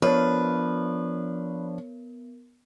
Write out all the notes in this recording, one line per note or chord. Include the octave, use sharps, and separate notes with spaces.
F3 B3 D4 A#4 B4 C#5